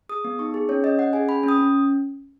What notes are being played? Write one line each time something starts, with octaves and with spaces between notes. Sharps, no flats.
G#4 D#6
B3
D#4 C#6
G#4
C#4 C#5
C#4 D#5
C#4 F#5
G#4 G#5
C#4 B5
C#4
D#6
C#4